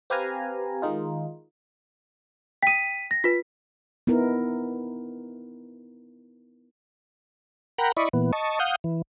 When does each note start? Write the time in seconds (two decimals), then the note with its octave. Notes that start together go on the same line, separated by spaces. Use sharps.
0.10 C4 G4 B4 F5 G#5 A#5
0.82 D#3 G#3 D#4 F4
2.63 G5 D#6 B6 D#7
3.11 A#6
3.24 F4 B4 B6
4.07 B3 D#4 E4 A#4
7.78 A#4 F#5 G5 A#5 B5
7.97 E4 D5 D#5 B5 C#6
8.13 A#2 E3 B3
8.33 D#5 A5 C#6
8.60 F5 F#5 D#6 G6
8.84 E3